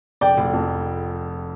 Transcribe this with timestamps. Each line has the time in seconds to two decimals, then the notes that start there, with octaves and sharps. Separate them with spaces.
0.21 F1 D5 G5
0.37 F1
0.53 F2